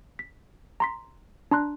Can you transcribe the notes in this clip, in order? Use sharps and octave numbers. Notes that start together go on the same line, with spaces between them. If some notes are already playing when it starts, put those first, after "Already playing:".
B6
A#5 C6 B6
D4 A#5 C6 F#6